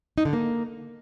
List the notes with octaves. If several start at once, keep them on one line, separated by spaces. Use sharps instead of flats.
D#4
D3
A#3